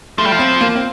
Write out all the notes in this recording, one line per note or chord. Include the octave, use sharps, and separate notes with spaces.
F3 A3
G3
F3
C4
A#3
C4